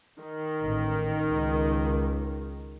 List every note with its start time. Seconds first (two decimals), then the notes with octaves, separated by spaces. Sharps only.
0.21 D#3
0.63 A1
1.27 C#2